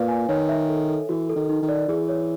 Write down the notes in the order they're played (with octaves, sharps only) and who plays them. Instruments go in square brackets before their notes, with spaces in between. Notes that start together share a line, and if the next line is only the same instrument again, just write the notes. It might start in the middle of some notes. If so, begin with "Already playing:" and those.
Already playing: [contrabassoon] A#2 [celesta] B4 D5 F5
[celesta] G#5
[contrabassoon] D#3 [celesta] C#5
[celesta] E5
A4
A4
[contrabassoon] E3 [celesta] F#4
[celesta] A4
[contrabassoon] D#3
[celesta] D#4
[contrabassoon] D#3
[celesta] D5
[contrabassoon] E3 [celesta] G#4
[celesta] C#5